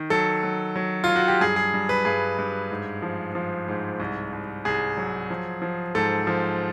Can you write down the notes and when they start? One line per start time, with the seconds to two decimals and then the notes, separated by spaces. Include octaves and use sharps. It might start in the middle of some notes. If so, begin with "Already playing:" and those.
Already playing: D#3
0.10 F#3 A4
0.43 F#3
0.76 F#3
1.04 F#3 F4
1.16 F#4
1.28 G4
1.41 G2 G#4
1.56 G#4
1.74 G2
1.89 B4
2.05 G2 G#4
2.38 G2
2.71 G#2
3.02 F3
3.35 F3
3.68 G#2
4.00 C2
4.33 C2
4.65 C2 G#4
4.97 F#3
5.30 F3
5.62 F3
5.95 G#2 A4
6.27 F3